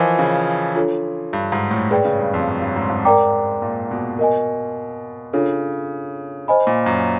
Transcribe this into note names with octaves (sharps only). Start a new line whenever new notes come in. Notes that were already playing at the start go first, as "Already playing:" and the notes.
Already playing: E3 F3 F4 A#4 D#5
C#3
D4 F4 A4 C#5
G2
G#2
A2
A2 G#4 B4 D5 G5
C#3
G2
F2
F#2
G2
G#2
G#2
A#4 D5 G5 A#5 D6
A#2
B2
A#4 D#5 G#5
C#3 D4 F4 A4 C#5
C5 D#5 G#5 B5
A#2
F#2